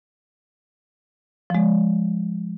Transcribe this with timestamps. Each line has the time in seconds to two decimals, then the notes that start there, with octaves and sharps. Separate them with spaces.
1.50 F3 G#3